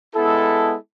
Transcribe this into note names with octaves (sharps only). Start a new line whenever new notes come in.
G#3 B3 E4 A4